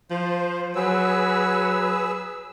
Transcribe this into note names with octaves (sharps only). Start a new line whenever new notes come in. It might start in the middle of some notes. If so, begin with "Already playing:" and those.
F3 C5
F#3 G#4 B4 E6